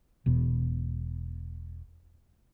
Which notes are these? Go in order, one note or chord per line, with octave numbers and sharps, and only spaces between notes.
E1 B2